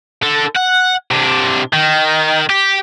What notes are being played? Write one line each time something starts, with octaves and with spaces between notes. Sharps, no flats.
D3 A4
F#5
C3 D4
D#3
G4